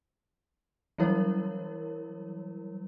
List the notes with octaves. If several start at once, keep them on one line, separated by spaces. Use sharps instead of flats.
E3 F#3 G3 E4 A#4 C#5